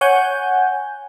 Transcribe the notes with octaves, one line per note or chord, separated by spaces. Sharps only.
C#5 F#5 G#5 G6